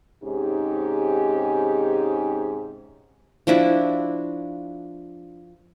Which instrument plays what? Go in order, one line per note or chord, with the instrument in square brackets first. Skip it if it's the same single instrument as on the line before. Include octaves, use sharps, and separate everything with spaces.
[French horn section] G#2 C3 C#4 D#4 G4 G#4
[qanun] F3 D4 E4 F#4